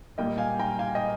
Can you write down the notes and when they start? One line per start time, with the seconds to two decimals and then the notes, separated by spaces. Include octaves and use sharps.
0.18 A#2 G3 A#3 D#5 G5
0.38 F5 G#5
0.59 G5 A#5
0.79 F5 G#5
0.95 D#5 G5